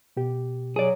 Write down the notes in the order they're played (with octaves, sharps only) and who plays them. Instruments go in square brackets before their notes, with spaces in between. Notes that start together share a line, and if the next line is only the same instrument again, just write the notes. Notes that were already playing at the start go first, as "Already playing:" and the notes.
[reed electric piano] B2 G4
[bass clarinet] F#3 [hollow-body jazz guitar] G#4 D5